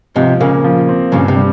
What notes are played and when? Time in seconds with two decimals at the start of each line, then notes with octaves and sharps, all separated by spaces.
0.16 G#2 C3 F3
0.40 A#2 C#3 A#3
0.64 F3
0.89 C4
1.12 G2 A#2 C#3
1.28 C3
1.36 G3